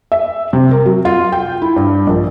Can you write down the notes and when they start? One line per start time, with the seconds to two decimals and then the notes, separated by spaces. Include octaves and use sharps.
0.12 E5
0.53 C3
0.71 A#4
0.86 F#3
1.05 F4
1.32 G5
1.62 E4
1.76 G2
2.07 A#1